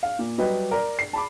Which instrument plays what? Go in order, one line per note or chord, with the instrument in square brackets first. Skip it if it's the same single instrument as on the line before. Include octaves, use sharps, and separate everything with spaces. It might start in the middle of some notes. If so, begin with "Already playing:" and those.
[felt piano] F5
A#2
F#3 G3 B4 D#5
A#4 D5 A#5
C7
A5 B5 D6